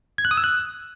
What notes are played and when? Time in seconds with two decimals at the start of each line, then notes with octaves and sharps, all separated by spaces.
0.18 G#6
0.25 F#6
0.31 D#6
0.37 E6
0.44 F#6